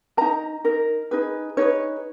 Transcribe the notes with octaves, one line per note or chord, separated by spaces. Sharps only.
D#4 A#4 A#5
D#4 A#4
D#4 G#4 B4
D#4 G#4 B4 C#5